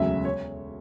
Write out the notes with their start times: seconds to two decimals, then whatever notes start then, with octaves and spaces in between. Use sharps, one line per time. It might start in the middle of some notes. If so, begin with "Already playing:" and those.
Already playing: E1 D2 C#3 F#3 E5
0.25 C#5